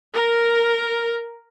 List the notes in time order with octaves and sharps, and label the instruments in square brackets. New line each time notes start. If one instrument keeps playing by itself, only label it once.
[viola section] A#4